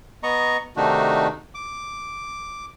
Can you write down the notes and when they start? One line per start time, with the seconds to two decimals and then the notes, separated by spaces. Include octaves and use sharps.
0.23 B3 D#5 A#5 C#6
0.77 C3 D#3 A3 D4 D#4 F#4
1.55 D6